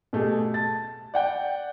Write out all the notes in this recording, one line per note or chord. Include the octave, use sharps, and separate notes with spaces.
B2 A3 G4 G#4
A5 A6
D5 F#5 G5